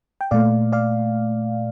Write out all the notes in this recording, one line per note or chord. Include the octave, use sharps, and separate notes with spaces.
G5
A#2 A3 D5 F5
D5 F5